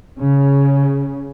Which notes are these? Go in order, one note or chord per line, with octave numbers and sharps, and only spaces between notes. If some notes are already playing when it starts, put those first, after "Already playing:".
C#3